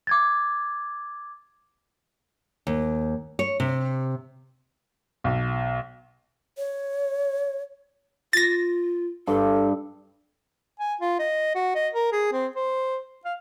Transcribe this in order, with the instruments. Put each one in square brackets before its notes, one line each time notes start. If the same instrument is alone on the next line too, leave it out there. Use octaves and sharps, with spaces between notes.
[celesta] D6 G#6 A6
[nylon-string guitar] D#2
C#5
C3
[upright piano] B1
[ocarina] C#5
[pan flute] F4 [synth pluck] A6 A#6
[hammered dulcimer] G2 [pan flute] A4
[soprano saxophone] G#5
F4
D#5
F#4
D#5
A#4
G#4
C4
C5
F5